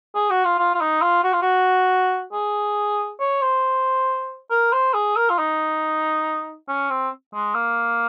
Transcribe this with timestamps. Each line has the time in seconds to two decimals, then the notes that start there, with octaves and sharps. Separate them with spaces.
0.15 G#4
0.30 F#4
0.45 F4
0.59 F4
0.75 F4
0.81 D#4
1.02 F4
1.24 F#4
1.33 F4
1.42 F#4
2.33 G#4
3.20 C#5
3.42 C5
4.51 A#4
4.73 C5
4.94 G#4
5.17 A#4
5.30 F4
5.38 D#4
6.68 C#4
6.90 C4
7.34 G#3
7.55 A#3